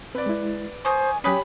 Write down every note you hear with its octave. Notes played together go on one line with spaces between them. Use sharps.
C4 B4 D5
G#3 E4
C5 G#5 C#6 D#6
F#3 C#4 G4 C#5 G#5 B5 D#6